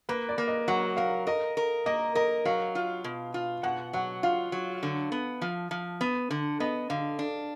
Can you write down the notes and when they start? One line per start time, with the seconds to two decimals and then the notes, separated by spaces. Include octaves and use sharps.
0.09 A#3 B4
0.29 D5
0.38 A#3
0.48 D#5
0.68 F#3 F#5
0.97 A#4 F5
1.27 A#4 D#5
1.57 A#4
1.86 A#3 D#5
2.15 A#4 D#5
2.45 F#3 F5
2.75 F4
3.04 B2
3.34 F4
3.63 B2 F#5
3.93 F#3 F#5
4.23 F4 F5
4.52 F#3
4.83 D3
5.12 B3
5.42 F3
5.71 F3
6.01 B3
6.31 D3
6.60 B3 D#5
6.90 D3 F5
7.19 D4